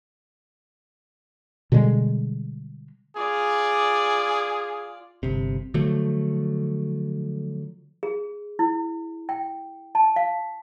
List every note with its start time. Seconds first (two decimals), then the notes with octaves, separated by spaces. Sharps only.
1.72 B2 D3 G3 G#3
3.17 F4 G#4 D5
5.23 G1 C3
5.74 D3 F3 F#3 A3
8.03 G#4
8.59 E4
9.29 G5
9.95 A5
10.16 F5